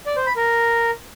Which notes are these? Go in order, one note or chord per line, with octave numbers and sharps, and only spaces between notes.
D5
C5
B5
A#4